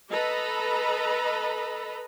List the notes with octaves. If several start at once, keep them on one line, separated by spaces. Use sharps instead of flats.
A4 B4 D#5 A#5 B5